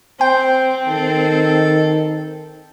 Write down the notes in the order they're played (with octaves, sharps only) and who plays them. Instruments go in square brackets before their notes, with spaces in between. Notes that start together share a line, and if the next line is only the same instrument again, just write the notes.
[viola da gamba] C4 [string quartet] C5 [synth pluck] G5
[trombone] D#3 [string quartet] A4